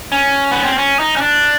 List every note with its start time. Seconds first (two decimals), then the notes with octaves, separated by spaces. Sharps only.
0.12 C#4
0.51 B3
0.64 C4
0.78 C#4
0.99 D#4
1.16 C#4
1.21 D4